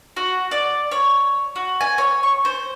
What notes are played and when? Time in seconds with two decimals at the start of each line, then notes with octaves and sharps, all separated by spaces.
0.16 F#4
0.51 D5
0.91 C#5
1.56 F#4
1.81 G#5
1.98 C#5
2.23 C#6
2.45 C5